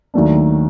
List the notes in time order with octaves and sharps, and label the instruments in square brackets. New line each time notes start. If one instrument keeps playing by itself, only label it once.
[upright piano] D#2 D#3 F#3 A3 D4